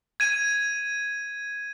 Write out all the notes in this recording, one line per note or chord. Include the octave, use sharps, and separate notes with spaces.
G#6 D#7